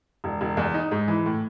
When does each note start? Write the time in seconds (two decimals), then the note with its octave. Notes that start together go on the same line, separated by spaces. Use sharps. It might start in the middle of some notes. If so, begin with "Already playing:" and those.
0.24 E1
0.41 E1
0.57 E2
0.74 D#4
0.91 G#2
1.08 E3
1.26 A2